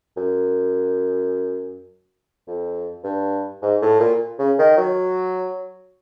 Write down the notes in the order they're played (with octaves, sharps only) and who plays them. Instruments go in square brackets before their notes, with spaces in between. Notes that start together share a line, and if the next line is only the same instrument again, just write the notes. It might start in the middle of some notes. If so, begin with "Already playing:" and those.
[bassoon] F#2
F2
G2
G#2
A2
A#2
C#3
D#3
F#3